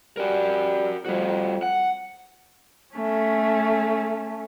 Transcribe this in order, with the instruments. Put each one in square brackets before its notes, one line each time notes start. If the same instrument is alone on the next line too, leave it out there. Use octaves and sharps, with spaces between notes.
[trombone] G3 [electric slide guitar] F#4 A#4
[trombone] F2 [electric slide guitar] G3 F#4
[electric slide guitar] F#5
[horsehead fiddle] A3 C#4